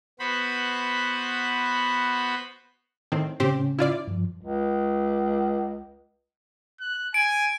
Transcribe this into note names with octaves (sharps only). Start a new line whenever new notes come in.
B3 F#4 C5 B5
A2 D#3 C4
A2 C#3 C4 C#4 G4 C5
E4 F4 D5
G2 F3
C#2
F#6
G#5 D7